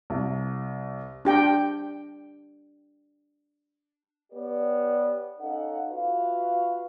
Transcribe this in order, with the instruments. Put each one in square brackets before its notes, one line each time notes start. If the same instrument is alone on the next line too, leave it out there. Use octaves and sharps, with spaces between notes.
[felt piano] C2
[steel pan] D4 G4 G5
[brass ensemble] B3 G4 B4 C#5 D5
C#4 D#4 A4 D#5 F5 F#5
F4 F#4 B4 E5 F5